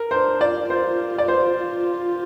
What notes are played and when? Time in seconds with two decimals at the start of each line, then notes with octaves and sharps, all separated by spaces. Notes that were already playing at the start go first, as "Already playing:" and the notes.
Already playing: A#4
0.11 D4 C5
0.41 F4 D5
0.70 F4 C5
1.18 D5
1.28 C5
1.58 F4